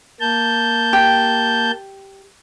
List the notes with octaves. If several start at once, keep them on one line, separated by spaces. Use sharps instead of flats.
A#3 A5 G6
G4